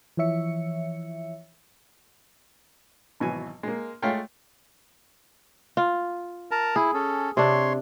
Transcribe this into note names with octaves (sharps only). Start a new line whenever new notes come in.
E3 F3 C#5 E5 C#7
G#1 B2 E3 F#3 G#5
G#3 A#3
G#3 A3 F4 C#5 F5 G5
F4
A#4 A5 A#5
E4 G#4
C#4 A4
C3 D4 C#5 C6